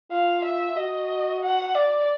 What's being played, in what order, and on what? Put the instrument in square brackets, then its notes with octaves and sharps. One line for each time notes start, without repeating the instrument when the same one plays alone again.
[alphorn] F4 [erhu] F5
[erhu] E5
[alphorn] F#4 [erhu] D#5
[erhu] F#5
D5